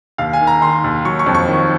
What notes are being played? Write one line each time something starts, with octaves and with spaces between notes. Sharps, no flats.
D#2 F5
G#5
D#3
A#5
D#3 C6
D#2
F#3 C#6
C#6
F2
C#6
D#3